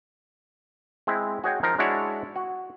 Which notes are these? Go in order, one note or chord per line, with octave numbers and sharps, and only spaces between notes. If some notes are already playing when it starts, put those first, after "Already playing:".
G#3 C4 E4
F#4 G#4 C#5 D#5 F#5 G5
F3 D#4 A#4 F5
G#3 D4 E4 F#4 C#5 D5
F#4